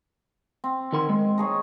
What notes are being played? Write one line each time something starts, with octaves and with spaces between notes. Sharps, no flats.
C4
D#3 A#4 C6
G#3
D#4 G#4 C#5